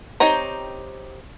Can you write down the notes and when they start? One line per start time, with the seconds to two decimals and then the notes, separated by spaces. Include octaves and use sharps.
0.20 C4 D#4 G4 C#5 A#5